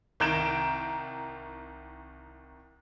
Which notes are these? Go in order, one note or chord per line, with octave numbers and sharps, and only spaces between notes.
C2 D#3 A#5 G6 D7 E7